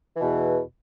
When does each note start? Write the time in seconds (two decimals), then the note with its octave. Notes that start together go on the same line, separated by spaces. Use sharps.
0.17 E3
0.20 B2
0.23 E2